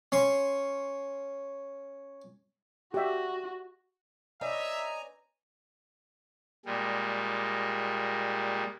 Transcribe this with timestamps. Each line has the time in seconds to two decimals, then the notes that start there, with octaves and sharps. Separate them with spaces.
0.12 C#4 C6 C#6
2.94 F#4 G4 E5
4.41 D#4 B4 C#5 D5 E5 G#5 A#5
6.65 A#2 G3 G#3